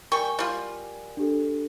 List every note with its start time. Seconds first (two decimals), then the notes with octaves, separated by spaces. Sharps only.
0.12 G3 A#4 G5 G#5 C#6
0.39 G3 F4
1.17 D4 G4 A4